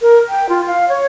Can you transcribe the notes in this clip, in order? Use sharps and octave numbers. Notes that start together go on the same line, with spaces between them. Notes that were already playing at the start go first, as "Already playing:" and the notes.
A#4
G5
F4
F5
C#5